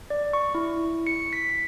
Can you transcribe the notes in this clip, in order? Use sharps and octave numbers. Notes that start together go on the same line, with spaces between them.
D5
C#6
E4
C#7
B6